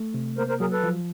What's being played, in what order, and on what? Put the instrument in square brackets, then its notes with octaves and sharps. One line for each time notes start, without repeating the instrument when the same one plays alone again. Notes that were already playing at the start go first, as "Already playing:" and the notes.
Already playing: [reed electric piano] A3
C3
[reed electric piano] A#3 [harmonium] A#4 C5
[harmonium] A#4 C5
[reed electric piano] F#3 [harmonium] G#4 A#4
[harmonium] A4 B4
[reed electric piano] F3